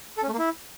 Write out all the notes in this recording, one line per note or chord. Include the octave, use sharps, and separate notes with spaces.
A4
C#4
A3
A#3
E4